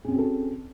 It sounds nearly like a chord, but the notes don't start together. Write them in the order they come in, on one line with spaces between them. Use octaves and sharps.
G#4 C#4 C4 F#4 A4